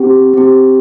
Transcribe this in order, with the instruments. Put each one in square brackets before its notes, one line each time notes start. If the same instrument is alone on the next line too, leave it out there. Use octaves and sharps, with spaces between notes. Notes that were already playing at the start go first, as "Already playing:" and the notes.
Already playing: [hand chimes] C4 G4
C4 G4